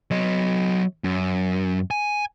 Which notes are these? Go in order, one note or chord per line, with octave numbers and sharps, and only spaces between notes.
F#3 D#5
F#2
G#5